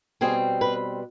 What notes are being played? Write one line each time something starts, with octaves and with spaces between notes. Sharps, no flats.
B2 G3 C4 G#4
B4